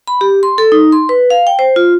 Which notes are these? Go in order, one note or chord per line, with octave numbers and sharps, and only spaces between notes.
B5
G4
C6
A4
D#4
C6
B4
F5
G5
C5
F4